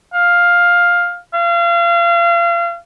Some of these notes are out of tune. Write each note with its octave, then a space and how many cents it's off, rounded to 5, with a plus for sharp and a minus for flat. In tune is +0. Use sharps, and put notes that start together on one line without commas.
F5 +10
F5 -35